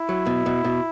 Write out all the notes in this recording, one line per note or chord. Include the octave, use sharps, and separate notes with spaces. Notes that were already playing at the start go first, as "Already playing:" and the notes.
Already playing: E4
F#3
B2
B2
B2